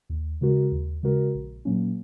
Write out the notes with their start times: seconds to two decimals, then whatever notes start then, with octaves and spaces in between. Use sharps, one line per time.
0.09 D#2
0.41 C#3 G#3 F#4 A#4
0.72 D#2
1.03 C#3 G#3 F#4 A#4
1.35 A#1
1.65 A#2 F#3 A#3 C#4